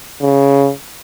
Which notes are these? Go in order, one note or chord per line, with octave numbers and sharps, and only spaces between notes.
C#3